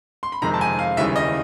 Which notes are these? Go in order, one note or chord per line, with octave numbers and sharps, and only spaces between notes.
C6
B5
F2 C3 D#3 G#3 A#5
A5
G#5
F5
D#2 C#3 E3 G3 E5
D#5